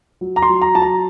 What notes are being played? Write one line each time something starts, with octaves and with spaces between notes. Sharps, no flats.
F#3
A#5
C6
F#3
A#5
F#3 A5
A#5